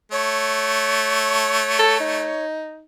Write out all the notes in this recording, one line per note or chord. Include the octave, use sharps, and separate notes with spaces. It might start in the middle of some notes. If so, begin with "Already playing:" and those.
A3 C#5
A4
D#4